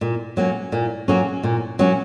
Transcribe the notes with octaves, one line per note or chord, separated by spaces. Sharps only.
A#2
F#3 A#3 C#4
A#2
F#3 A#3 C#4
A#2
F#3 A#3 C#4